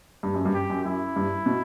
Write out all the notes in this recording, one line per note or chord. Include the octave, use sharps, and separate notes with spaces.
G2
F#2
G2
G4
F#2
F#2 E4
G2
B2